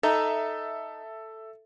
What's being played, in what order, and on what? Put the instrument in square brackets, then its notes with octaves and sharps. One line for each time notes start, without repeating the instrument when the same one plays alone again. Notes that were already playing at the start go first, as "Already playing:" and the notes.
[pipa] D#4 [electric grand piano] A4 E5